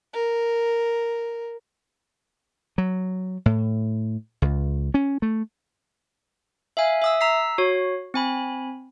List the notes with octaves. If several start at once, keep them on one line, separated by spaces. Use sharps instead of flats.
A#4
F#3
A2
C#2
C#4
A3
E5 F5 G#5
E5 D#6 E6
A#5 E6 B6 C7
F#4 C#5
C4 G#5 B5